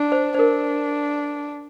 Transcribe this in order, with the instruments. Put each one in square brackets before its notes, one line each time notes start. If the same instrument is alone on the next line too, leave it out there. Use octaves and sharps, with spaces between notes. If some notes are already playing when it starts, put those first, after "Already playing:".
Already playing: [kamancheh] D4
[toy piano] C5
C5
[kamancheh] D4 [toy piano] A#4